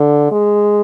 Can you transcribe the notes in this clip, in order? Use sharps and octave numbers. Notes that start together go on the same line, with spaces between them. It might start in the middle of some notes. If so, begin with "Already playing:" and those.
Already playing: D3
G#3